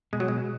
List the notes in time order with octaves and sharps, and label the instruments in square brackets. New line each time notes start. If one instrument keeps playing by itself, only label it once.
[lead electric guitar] B2 [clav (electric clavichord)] G#3
[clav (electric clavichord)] F#3
G#3